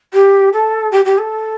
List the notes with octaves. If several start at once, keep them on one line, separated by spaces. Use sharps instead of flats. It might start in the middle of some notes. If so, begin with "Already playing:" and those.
G4
A4
G4
G4
A4